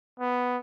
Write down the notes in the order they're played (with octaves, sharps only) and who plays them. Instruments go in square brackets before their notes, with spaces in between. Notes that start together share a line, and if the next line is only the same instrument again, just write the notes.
[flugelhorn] B3